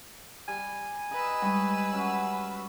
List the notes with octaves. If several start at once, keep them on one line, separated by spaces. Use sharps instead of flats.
G3 G#5
B4 D#5 A#5 E6
G3 G#3 C#5 D#5 B5
F#3 C#4